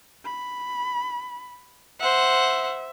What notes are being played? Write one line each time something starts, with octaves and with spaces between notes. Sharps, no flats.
B5
C5 E5 F#5